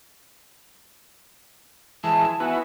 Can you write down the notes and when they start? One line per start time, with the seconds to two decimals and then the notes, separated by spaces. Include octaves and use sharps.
2.03 E3 G#3 A5
2.40 B3 E4 F#4 G#5